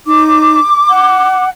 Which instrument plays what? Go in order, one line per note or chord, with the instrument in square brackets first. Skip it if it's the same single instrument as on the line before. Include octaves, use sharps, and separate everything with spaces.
[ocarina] D#4 [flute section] D6
[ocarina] F#5